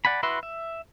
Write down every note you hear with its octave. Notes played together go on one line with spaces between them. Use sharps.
D5 F#5 G#5 B5
E4 F#4 B4 E5 C6
E5